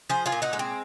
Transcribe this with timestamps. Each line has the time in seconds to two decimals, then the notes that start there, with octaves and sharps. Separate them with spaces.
0.10 F3 G#4 C5
0.26 F4 G#4
0.32 A#2
0.42 D#4 F#4
0.53 G#3
0.59 C4